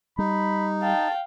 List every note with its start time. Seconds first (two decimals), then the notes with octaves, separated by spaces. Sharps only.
0.18 G3 D#4 B5
0.82 F5 G5 A5